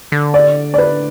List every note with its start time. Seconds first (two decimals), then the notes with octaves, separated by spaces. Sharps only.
0.12 D3
0.34 D5
0.74 D5
0.78 B4